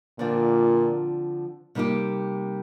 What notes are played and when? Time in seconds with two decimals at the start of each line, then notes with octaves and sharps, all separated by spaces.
0.19 A#2 D3 F3 C4 F4
1.75 C3 G3 A#3 D#4 G4